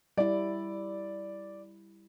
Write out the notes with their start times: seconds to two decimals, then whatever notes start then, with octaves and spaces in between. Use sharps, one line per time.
0.17 G3 E4 D5